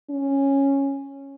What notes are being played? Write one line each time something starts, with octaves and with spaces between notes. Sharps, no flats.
C#4